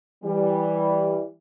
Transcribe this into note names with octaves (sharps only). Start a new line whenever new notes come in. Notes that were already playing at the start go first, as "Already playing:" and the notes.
E3 G3